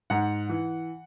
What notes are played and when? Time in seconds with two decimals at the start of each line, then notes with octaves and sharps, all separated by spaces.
0.10 G#2 F#5
0.49 E3